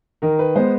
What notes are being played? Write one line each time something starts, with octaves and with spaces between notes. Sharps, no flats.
D#3 A#4
B4
G#3 B3 C5